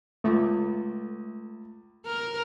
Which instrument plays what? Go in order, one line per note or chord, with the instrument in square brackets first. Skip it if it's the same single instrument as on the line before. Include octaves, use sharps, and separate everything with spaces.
[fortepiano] C#2 D6 [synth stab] A3
[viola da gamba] A#4